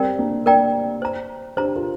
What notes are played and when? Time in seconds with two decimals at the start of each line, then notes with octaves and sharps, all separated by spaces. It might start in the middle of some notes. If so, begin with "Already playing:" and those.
Already playing: G3 C4 A#4 D5 G5 A#5
0.18 A#3 D4
0.46 A#3 D4 A#4 D5 G5 A#5
1.02 C5 A#5
1.57 D4 G4 C5 A#5
1.76 F4 A#4